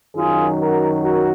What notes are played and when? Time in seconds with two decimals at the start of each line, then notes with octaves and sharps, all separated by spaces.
0.17 F#2 D#3 F#3 F4 G#4
0.59 F#4 A#4
1.02 F#4 A#4